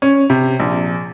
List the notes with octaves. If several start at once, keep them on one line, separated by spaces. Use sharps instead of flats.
C#4
C3
A#1